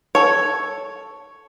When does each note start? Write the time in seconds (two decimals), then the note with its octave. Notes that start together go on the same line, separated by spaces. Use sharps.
0.15 A4 C#5